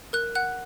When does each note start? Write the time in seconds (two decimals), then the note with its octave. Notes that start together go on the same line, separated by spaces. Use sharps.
0.13 A#4 F#6
0.35 F#5 F#6